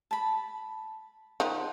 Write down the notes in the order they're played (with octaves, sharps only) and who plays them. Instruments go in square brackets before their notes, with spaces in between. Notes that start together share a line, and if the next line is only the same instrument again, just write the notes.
[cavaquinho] A5 B5
[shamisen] D#3 F3 [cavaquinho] F#5